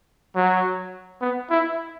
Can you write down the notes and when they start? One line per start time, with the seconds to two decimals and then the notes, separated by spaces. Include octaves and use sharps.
0.36 F#3
1.21 B3
1.50 E4